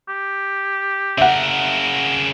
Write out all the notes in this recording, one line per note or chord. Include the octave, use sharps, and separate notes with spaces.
G4
C#3 A#4 E5 F#5